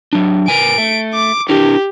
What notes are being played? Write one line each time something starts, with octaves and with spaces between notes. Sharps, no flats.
F#3 D4
A#4 B4 G#5 D7
A3
D6
D4 E4 G4 A#4